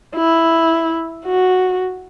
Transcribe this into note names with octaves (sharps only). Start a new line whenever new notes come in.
E4
F#4